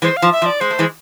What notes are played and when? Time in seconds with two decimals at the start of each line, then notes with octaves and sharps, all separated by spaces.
0.02 E3 G#3 C5
0.17 F5
0.22 F3
0.32 E5
0.42 F3
0.46 D5
0.60 G#3 C5
0.70 A3
0.79 E3 G#3